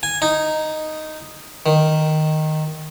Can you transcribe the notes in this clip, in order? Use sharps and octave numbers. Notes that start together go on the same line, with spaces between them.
G#5
D#4
D#3